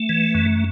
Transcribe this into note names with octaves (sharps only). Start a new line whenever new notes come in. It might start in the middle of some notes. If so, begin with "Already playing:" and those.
Already playing: A3
E3
F#2